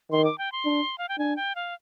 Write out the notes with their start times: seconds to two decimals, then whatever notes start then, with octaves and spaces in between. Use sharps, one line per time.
0.11 D#3 C6
0.24 D6
0.38 G5
0.52 C6
0.65 D4
0.98 F5
1.09 G5
1.18 D4 G#5
1.36 G5
1.55 F5